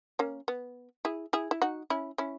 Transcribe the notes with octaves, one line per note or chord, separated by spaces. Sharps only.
A#3 C#4
B3
E4 G#4
E4 G#4
E4
D#4 F#4
C#4 E4
C#4 E4